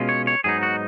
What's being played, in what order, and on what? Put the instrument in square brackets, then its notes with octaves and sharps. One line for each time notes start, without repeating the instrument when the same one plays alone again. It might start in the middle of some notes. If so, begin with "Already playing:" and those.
Already playing: [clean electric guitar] B2 G#3 C#4 F4
C#5
C#5
G#2 F#3 B3 D#4 G#4
F#4